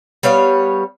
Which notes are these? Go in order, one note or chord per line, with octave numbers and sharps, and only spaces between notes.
G3 B3 C#5 F5